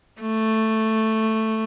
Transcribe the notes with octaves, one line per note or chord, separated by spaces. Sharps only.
A3